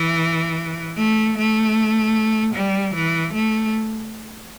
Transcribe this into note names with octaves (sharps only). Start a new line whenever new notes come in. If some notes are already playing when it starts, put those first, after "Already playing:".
Already playing: E3
A3
A3
G3
E3
A3